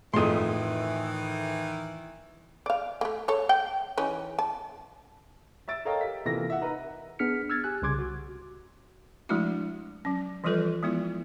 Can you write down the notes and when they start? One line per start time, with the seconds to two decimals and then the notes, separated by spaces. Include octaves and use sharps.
0.14 F2 A2 D#3 E3 C6 D#6
2.66 D5 F5
3.01 A3 A#3
3.28 A4 C#5
3.49 G5
3.98 E3 C#4 D#4
4.39 A5
5.68 E5 E6 A6 D7
5.85 A4 A#4 C#5 D#5 F5 G5
6.01 G4 B6
6.25 C3 E3 A#3 F4 A4 A#6
6.50 E5 F#5
6.61 D#4 A#4 B4 A#5
7.19 B3 D4 G#4 F6 B6 C#7
7.50 E6 F6 G#6 A6
7.64 G4 G#5 F#6
7.82 C2 C#3 C6 D6 G#6
7.99 F#4
9.29 F3 G#3 A3 D4 E4 F#4
10.05 F#3 C#4
10.44 E3 F3 G3 F4 A4 B4
10.83 F3 G#3 B3 E4 F4